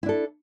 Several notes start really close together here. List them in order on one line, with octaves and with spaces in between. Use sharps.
E4 D4 A4